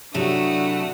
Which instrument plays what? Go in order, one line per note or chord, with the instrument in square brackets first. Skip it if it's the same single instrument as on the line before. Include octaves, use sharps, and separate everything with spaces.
[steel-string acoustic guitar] C3 F#3 E4 [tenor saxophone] A3 [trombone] D4 [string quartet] F#4 D#6